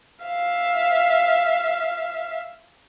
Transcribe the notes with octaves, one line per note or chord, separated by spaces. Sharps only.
E5 F5